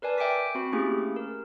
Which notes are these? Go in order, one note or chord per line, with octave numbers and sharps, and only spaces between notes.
A#4 B4 D5 G#5 A5
E5 G5 G#5 D6 B6
C4 F#4 B5
A3 A#3 C#4 E4 G4 G#4
A#4